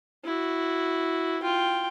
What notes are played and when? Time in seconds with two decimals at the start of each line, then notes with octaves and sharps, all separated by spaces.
0.25 E4 F#4
1.42 F4 G5